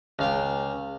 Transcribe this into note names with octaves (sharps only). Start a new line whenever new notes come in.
C#2 F5 G5